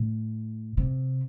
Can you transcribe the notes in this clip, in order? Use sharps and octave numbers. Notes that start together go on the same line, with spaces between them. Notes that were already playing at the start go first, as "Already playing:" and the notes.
Already playing: A2
C3